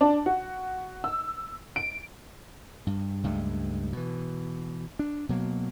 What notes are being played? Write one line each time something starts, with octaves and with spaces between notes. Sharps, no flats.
D4
F#4
E6
D7
G2
C#2 G2 G#3 A3
B2 E3
D4
B2 F#3 A#3